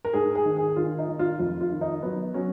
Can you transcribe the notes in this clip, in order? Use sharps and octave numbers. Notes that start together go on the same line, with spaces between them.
A#4
G#2 G#4
G#4
D#3
G#4
D#3 F4
D#4
D#3
F4
F2 F4
F4
D#3
D#4
F#3 B3
F#3 C#4